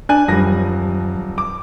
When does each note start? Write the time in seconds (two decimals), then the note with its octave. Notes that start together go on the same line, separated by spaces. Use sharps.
0.09 D4 G#5 F#6
0.28 D#1 F#2 F3 G3 A#6
1.38 D6